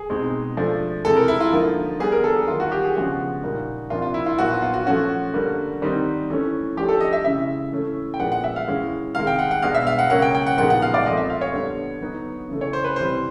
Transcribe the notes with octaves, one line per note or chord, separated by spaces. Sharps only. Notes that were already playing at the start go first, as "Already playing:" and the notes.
Already playing: G#4
B2 G#3 C4 D#4
F3 A3 D4
C3 E3 G#3 A4
A#4
E4
F4
D3 F3 A#3 D#4
D3 G3 B3 G#4
A#4
A4
G#4
D#3 F#3 A#3 F4
F#4
G4
G#4
C#3 F3 G#3 B3 D4 F#4
A#2 G3 A#3 D#4
C3 F3 A#3 D4 F4
F4
E4
F4
A#2 F#3 B3 D#4 F#4
F4
F4
F#4
F3 A3 C#4 F#4
D3 G3 A#3
D#3 G3 C4 D#4
E3 A3 C#4
F3 A3 D4 G4
A4
D#5
E5
C#3 E3 G#3 C#4 E5
E3 A3 C#4
G5
A#2 F3 G#3 B3 D4 F#5
F#5
E5
F5
E3 G#3 C#4
C3 D#3 G#3 F5
G5
F#5
F#5
B2 G#3 B3 D4 F5
E5
F5
F#5
C#3 F#3 A#3 C#4 F#5
G5
G5
F#5
A#2 F3 G#3 B3 D#4 F#5
F#5
F5
D5
F3 A3 C4 D#5
E5
F5
C#5
D3 G3 B3
D3 F#3 B3 D#4
C#3 E3 A3
C#5
C5
B4
C3 E3 G3 C5